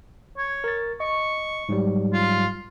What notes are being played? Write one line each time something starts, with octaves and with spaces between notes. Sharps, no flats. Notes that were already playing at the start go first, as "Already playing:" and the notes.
C#5
A#4 A6
D#5 C#6
G#2 F#3 G3
F4